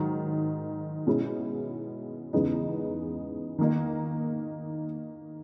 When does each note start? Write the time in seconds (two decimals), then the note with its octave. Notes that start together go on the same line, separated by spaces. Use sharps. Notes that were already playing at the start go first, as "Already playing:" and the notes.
Already playing: G#2 D#3 F#3
1.07 B2 G#3 C#4 E4
2.33 E2 C#3 G#3 B3 D#4
3.58 D#3 A#3 D#4